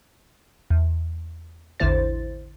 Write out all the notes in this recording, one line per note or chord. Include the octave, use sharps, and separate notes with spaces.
E2
A1 E2 D3 E4 C5 A6